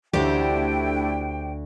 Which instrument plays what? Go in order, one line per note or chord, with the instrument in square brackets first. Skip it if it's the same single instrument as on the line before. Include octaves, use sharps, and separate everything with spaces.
[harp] D2 [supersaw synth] A3 D4 E4 [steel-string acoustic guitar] G4 C5 D5 [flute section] G5